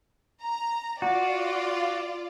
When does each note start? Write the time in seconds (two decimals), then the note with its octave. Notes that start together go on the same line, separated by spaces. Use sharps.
0.42 A#5
1.02 F4 F#4 D5